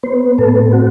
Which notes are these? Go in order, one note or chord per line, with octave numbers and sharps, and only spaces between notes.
B3 C5
A2 A4
C4 F#4